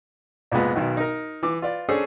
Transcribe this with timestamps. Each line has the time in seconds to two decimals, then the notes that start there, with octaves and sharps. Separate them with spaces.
0.52 C2 F2 A#2 G#3 B3
0.75 B1 B2 D#3 F#3
0.97 D#4 A#4
1.43 E3 D6
1.62 F4 B4 D5
1.89 C#4 D4 G#4 A4 C5